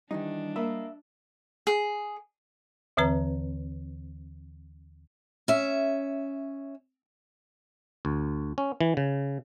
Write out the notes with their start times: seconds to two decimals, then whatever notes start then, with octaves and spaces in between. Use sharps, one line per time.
0.11 D#3 E3 G3 D4 D#4
0.56 A#3 A#4 D#5 E5 B5
1.67 G#4
2.97 D#2 D3 E3 C4 B4 A#5
5.48 C#4 E5
8.05 D2
8.58 C#4
8.81 E3
8.97 C#3